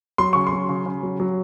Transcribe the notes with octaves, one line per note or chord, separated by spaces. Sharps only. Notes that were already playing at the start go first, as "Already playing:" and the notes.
F#3 C6
C#3 C#6
C6
F#3
C#3
C#3
F#3
F#3